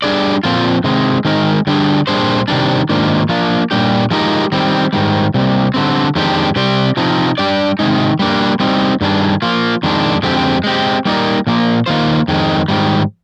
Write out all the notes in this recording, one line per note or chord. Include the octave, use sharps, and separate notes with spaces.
G3 D4 G#4 D5
A#2 F3 C4 F4
C3 D#3 G#3 C4
D#3 G#3 C4 D#4 A#4
D3 G3 D4 G#4
A#2 G3 D4 G#4 C5
C3 D#3 G3 D4
G#2 D#3 A#3 D4 F4
F3 A#3 D4 F4
A#2 G3 D4 G4
F3 G#3 D#4 G4 A#4
D#3 G3 C4
G#2 D#3 G3
C3 G3 A#3
D3 G3 C4
F2 D#3 G#3 D4 G4
C3 G3 C4 G4 D5
C3 F3 C4 D#4
G3 D4 G4 D5
C3 D#3 G#3 D#4
G3 A#3 D4
G3 C4 D#4
G2 D#3 G3 D4 G#4
F3 A#3 F4
F2 D#3 G#3 D4
F2 D3 G#3 C4 G4
G#3 C4 G4
G3 A#3 D#4 A#4 D5
A#2 F3 A#3
D#3 A#3 F4 C5
F2 D#3 G#3
G#2 D#3 G3